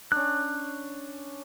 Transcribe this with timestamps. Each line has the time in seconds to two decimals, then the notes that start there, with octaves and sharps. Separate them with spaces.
0.12 C#4 D4 F#6